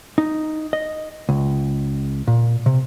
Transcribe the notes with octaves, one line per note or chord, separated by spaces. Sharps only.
D#4
D#5
C#2
A#2
C3